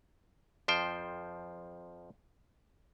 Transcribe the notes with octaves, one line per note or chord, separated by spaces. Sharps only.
F2 F3 C5 G5